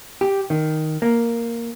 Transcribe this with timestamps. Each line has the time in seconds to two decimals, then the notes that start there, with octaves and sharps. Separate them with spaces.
0.21 G4
0.50 D#3
1.02 A#3